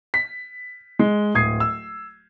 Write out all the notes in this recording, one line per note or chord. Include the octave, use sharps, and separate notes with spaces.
B6
G#3
D1 D#6 G#6 C7
E6